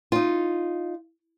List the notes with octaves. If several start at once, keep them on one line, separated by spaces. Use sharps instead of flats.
D#4 F4